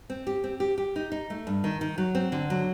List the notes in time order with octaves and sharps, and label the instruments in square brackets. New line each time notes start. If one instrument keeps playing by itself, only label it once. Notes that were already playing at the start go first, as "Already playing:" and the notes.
[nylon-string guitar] C4
G4
C4
G4
G4
D#4
D#4
A3
G2
D#3
D#3
F#3
C4
D3
F#3